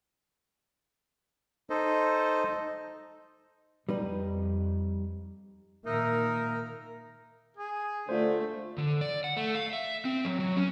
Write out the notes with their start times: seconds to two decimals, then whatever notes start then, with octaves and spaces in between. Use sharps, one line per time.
1.70 D#4 A4 C5 D#5
3.89 F2 G3 D#4 B4
5.86 A#2 D#3 A#3 D#4 A#4 E5
7.57 G#4
8.09 D3 A3 F4 C5
8.78 D3
9.01 D5
9.24 F#5
9.37 A3
9.55 F5
9.73 E5
10.05 C4
10.25 F#3
10.40 F#3
10.57 C#4